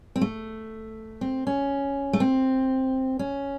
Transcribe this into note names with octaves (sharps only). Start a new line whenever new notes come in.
C4
A3
C4
C#4
A3
C4
C#4